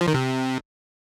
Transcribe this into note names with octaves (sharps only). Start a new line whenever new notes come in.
F3
D#3
C3